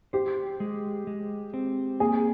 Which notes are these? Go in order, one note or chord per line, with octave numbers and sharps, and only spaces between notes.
G4 C5
G#3
G#3
C4
A#3 G#4